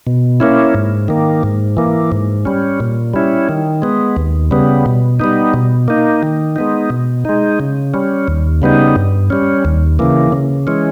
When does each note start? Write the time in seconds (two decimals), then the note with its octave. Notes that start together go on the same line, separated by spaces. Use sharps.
0.07 B2
0.40 A#3 C#4 E4
0.75 G#2
1.08 D#3 A#3
1.43 G#2
1.77 E3 A#3
2.12 G#2
2.45 G3 C#4
2.80 A#2
3.14 G3 C#4 E4
3.49 D#3
3.82 G#3 B3
4.16 D#2
4.51 C#3 G3 B3
4.86 B2
5.20 G3 B3 D#4
5.54 B2
5.88 A#3 D#4
6.23 D#3
6.56 G#3 B3 D#4
6.90 B2
7.25 G#3 D#4
7.60 C#3
7.94 G3 C#4
8.28 D#2
8.62 C#3 G3 B3 D#4
8.96 G2
9.30 G3 C#4
9.65 D#2
9.99 C#3 E3 A#3
10.32 C#3
10.67 E3 G#3 C#4